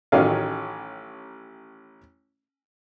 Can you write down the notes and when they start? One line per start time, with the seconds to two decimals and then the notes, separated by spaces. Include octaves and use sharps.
0.12 A1 D#3 F#3 A3 C#4 F5